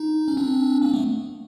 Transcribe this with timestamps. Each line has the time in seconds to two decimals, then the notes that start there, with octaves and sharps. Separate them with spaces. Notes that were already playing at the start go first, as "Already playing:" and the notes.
Already playing: D#4
0.28 C#4
0.37 C4 D4
0.82 A#3 C4
0.94 A3 B3